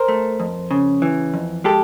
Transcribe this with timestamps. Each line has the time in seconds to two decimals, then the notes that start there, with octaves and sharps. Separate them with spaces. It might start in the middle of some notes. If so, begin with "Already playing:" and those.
Already playing: A#4 C5
0.08 A3
0.40 F2
0.71 C#3
1.02 E3
1.34 F2
1.64 G#3 G4 A4